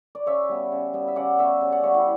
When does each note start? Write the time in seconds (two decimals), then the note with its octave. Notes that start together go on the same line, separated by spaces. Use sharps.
0.15 D5
0.26 C#3 C#5 E5
0.49 G3 B3
0.72 C#3
0.93 G3 B3
1.08 E5
1.16 C#3 D5 F#5
1.38 G3 B3 C#5 E5
1.61 C#3
1.72 D5 F#5
1.83 G3 B3 C#5 E5
1.94 E4 G4